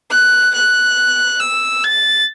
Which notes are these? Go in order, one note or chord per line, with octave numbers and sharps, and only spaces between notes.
F#6
F#6
E6
A6